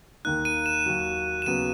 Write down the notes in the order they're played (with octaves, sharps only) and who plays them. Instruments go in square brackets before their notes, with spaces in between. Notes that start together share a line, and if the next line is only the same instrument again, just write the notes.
[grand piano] D#2 D#3 A#3 D#4 [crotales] F#6
[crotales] D#7
E7
[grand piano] D#2 D#3 F#3
[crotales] E7
[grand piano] D#2 C#3 F#3 B3 [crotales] D#7